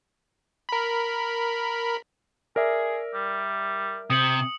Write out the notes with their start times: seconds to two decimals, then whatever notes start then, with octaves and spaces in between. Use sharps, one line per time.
0.69 A#4 B5
2.56 G#4 A#4 D5 E5
3.14 G3
4.10 C3 D#6 C#7 F#7